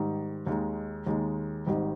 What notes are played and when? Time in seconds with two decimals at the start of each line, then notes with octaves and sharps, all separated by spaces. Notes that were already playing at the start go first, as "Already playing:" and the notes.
Already playing: G#2 D#3 G3
0.47 D#2 D#3 G#3
1.07 D#2 D#3 G#3
1.67 G#1 G#2 D#3 G3